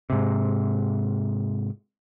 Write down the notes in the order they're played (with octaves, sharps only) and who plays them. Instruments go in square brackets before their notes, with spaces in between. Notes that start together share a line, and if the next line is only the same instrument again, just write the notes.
[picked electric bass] G#2 C3